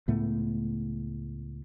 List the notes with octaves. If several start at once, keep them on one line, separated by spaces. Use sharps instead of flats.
C#2 A2 A3 B3